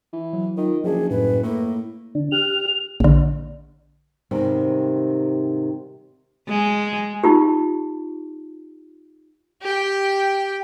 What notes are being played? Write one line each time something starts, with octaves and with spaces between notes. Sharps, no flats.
E3
F#3
D#3 F4
F#1 F3 D4 G#4
F#2 A2 B4
A2 A#3 E4
D3 D4
G4 F6 F#6 F7
A#1 D3
G#2 C3 D#3 G3
G#3
D#4 F4 G4
G4 G5